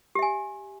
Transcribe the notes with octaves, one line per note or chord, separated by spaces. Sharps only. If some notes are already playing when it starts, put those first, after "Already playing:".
G4 E5 G#5